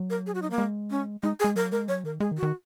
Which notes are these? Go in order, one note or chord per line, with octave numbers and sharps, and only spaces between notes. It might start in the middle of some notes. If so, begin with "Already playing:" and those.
Already playing: F#3
A#4
G#4
F#4
D#4
A#3
G#3
C#4
G#3 D#4
G#4
G#3
F#3 A#4
G#3 A#4
F#3 C#5
D#3 A#4
G#3 G#4
D#3
F#4
D#3